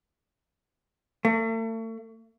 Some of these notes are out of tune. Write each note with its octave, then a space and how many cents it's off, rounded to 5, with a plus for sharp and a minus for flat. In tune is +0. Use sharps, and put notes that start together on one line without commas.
A3 +40